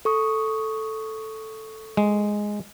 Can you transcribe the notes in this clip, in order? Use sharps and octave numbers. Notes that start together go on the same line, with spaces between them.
A4 C#6 D#6
G#3